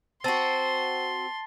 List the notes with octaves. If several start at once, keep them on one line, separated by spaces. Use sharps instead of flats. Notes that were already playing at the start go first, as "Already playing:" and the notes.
C4 F#4 A5 C6 A6